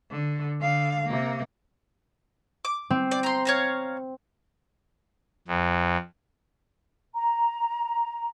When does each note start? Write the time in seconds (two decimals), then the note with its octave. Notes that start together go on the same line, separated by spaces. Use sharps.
0.10 D3
0.60 D3 F5
1.05 C3 A#3
2.65 D6
2.90 C4
3.11 D5
3.23 A#5 C6
3.45 C#5 F5 A#5
5.48 F2
7.14 A#5